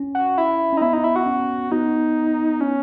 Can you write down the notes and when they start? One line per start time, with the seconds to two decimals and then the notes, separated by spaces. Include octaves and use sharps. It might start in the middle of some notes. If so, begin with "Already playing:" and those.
Already playing: C#4
0.15 F#4
0.38 E4
0.73 C#4
0.77 D#4
0.82 B3 E4
0.93 D#4
1.04 E4
1.16 F#4
1.26 C#4
1.72 B3 D#4
2.61 C#4